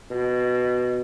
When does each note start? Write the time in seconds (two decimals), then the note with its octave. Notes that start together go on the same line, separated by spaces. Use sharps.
0.11 B2